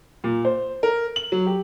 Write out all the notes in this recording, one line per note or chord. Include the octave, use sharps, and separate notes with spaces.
A#2
C5
A#4
F#7
F#3
G4